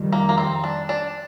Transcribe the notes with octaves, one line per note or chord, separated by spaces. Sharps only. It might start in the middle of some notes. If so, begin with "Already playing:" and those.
Already playing: F2 D#3 G3
A#3
A#3
C4
D4
D4